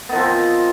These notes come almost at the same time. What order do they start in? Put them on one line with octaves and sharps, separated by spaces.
B3 D#3 F3 C4